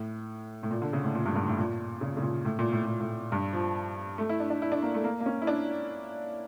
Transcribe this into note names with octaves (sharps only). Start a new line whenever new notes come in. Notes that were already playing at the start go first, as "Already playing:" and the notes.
Already playing: A2
A2
A#2
D3
C#3
A2
A#2
G2
G2
A2
A#2
C#3
C#3
A#2
A2
A#2
A2
A#2
A2
G2
F3
A3
E4
D4
D4
E4
D4
A#3
A3
A#3
A#3
C#4
E4
D4